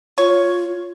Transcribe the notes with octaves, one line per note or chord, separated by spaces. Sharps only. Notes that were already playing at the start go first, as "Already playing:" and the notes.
F4 C#5